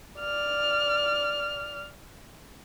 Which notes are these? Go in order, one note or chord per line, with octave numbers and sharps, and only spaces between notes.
D5 F6